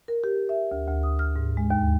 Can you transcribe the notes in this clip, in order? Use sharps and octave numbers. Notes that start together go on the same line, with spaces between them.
A#4
G4
E5
D2
D2
D#6
F6
G#2
G#3
D#2